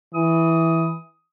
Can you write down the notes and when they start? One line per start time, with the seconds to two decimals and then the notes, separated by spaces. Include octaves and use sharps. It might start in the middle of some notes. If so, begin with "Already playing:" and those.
0.14 E3 D#6